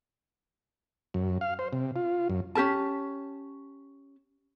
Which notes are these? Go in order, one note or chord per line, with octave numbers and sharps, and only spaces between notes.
F#2
F5
C5
C3
F4
F#2
C#4 G4 A#4 A5